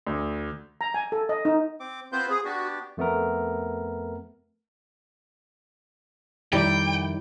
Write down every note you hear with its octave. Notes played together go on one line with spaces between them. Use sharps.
D2
A#5
G#5
A4
D#5
D#4
C4 D6
B3 C4 F4 B4 C5 G6
G#4
B3 D4 F#4 G4
F2 A3 B3 A#4
F2 D#3 G3 E4 D5 G5